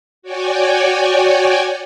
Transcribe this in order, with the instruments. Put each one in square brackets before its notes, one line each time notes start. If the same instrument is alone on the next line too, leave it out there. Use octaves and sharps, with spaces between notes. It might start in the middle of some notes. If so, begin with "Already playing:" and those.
[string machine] F#4 C#5 D5 G5 G#5